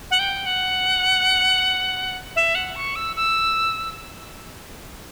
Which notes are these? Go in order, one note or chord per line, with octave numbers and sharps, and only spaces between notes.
F#5
G5
F#5
E5
F#5
C#6
E6
E6